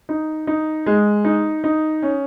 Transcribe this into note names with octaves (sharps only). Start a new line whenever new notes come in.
D#4
D#4
G#3
D#4
D#4
C#4